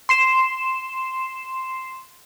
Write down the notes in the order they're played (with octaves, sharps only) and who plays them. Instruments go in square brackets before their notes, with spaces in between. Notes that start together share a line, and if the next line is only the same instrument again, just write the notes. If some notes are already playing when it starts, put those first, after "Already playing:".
[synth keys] C6 C7 E7